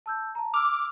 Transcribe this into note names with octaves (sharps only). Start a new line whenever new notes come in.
A5 E6 G6
A5 A#5
D6 E6 F6 F7